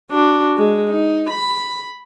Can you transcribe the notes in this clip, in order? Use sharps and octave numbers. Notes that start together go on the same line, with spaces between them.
D4 F#4
G#3
D#4
B5